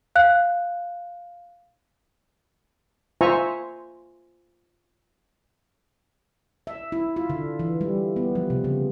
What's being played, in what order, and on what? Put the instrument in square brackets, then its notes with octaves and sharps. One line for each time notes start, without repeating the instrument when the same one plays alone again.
[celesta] F5 F#6
[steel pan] F4 C5 E5 G#5 A#5 C#6
[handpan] E5
E4
F4
D3
E3
G3
B3
F3
C3
C#3